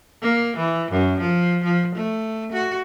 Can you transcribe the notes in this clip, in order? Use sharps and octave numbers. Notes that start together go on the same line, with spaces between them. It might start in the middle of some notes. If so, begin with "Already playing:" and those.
A#3
E3
F#2
F3
F3
A3
F#4